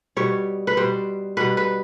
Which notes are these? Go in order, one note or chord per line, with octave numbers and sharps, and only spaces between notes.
B2 G3 C#5
B4
B2 G3 C5
B2 G3 B4
B4